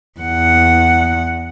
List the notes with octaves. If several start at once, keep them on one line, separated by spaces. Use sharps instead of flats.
E2 F#5